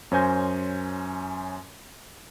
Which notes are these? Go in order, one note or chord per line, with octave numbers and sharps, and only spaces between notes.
F#2 C#4 C5 G#5 G6 A#6